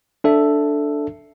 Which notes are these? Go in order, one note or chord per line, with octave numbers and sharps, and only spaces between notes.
D4 A4 E5